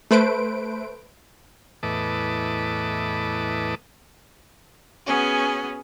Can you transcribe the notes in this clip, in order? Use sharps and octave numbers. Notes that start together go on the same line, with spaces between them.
A3 B4 C5 D7
E2 A2 B4 D#5 A5 D6
B3 C#4 F#4 G#4